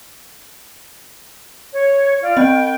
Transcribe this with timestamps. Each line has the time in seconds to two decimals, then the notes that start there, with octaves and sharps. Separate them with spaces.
1.72 C#5
2.22 F4 D5
2.37 C4 D#5 G5